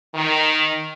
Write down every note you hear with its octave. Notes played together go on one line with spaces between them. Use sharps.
D#3